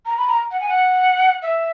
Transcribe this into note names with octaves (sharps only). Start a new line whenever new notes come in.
A#5
B5
A#5
F#5
G#5
F#5
E5